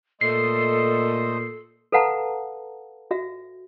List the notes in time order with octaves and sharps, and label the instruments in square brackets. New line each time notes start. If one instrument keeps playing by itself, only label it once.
[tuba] A#2 [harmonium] A3 C5 D#5 [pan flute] A4 [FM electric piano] C7
[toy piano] A4 B4 F5 F#5 A5 A#5
F#4 E5